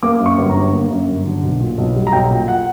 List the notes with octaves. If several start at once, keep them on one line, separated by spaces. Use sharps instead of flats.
A#3 D6
F#2
C#6
G1
A#5
D3
A#3
F#2
G1
D3
B1
A#2
B1
G3
A#5
B1 G5
A#2
F#5